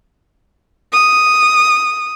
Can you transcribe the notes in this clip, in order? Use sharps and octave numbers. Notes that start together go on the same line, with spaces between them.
D#6